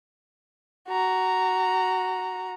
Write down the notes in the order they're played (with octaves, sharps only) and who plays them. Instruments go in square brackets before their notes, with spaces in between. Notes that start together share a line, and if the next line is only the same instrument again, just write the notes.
[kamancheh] F#4 A#5